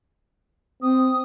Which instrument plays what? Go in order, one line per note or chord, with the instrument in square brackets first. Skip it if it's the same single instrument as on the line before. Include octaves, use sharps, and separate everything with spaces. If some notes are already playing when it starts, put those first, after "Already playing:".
[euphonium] C4 [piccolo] D#6